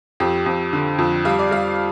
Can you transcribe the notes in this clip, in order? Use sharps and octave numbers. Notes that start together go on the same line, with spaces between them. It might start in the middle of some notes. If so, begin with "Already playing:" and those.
F2 G4
F2
D3
F2
G3 F5
D5
G3 F5